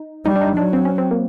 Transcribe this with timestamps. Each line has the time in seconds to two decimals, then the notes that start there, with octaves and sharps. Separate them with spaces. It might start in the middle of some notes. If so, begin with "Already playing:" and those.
Already playing: D#4
0.26 G3 D#4
0.36 D4
0.41 D#4
0.57 F#3 D4
0.73 C4
0.85 C#4
0.98 C4
1.11 A#3